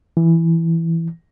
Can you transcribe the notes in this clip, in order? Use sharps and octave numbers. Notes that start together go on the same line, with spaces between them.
E3